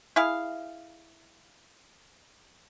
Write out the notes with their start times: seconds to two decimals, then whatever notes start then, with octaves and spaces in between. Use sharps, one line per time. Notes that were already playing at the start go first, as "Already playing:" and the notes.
0.16 E4 G#4 F5